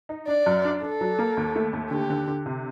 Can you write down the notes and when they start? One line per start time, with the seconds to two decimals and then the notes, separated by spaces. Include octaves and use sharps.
0.09 D#4
0.28 D4 D5
0.46 F#2
0.65 D4
0.82 D4 A4
1.01 F#3
1.19 A#3
1.37 D#2
1.56 A3
1.73 D#2
1.91 D3 G4
2.10 D3
2.27 D3
2.46 C3